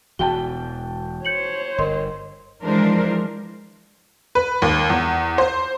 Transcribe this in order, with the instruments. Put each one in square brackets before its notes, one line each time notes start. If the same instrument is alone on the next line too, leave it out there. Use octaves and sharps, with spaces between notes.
[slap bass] E1 B2 E3 [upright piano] F#4 G5 A5 [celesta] G7
[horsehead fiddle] C5 C#5 [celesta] G6 C#7 F#7
[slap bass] G1 D3 [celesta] A#4 D#5 C6
[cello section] E3 F3 G#3 D4 A#4 C5
[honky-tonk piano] B4
D#2
E2
C5